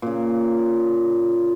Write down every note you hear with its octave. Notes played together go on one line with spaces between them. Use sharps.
A#2 C#3